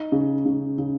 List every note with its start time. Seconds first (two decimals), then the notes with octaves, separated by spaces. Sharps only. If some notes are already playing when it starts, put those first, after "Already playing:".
Already playing: D#4
0.12 C#3
0.45 C#3
0.78 C#3